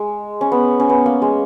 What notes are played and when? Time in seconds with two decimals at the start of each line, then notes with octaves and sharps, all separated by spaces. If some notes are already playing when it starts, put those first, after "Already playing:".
Already playing: G#3
0.41 C#4
0.52 B3
0.80 C#4
0.90 B3
1.06 A#3
1.22 G#3